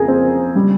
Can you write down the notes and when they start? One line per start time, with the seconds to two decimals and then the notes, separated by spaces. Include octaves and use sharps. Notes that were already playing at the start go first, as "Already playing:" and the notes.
Already playing: F2 C#3 G#4 A#4
0.08 C4
0.56 C#3 G3